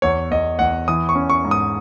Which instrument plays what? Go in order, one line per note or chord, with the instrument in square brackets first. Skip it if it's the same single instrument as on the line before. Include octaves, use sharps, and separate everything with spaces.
[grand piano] E2 C#5
E2 D#5
E2 F#5
E3 D#6
C#6
C#4
C#6
G#2
D#6